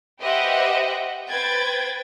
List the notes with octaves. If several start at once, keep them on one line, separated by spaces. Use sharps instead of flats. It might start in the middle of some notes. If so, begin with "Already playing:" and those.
G4 B4 C5 D#5 E5 F#5
B4 C5 G5 G#6 A6